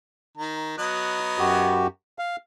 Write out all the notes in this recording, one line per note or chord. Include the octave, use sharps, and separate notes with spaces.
D#3 A#5
F#3 B3 D#5 F#6
F#2 F#4 G4
F5